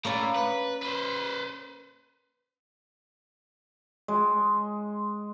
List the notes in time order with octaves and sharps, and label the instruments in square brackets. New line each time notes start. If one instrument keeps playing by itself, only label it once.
[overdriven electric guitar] A2 [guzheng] A#3 C#4 D5
[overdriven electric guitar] B4
B4 C5
[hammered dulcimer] G#3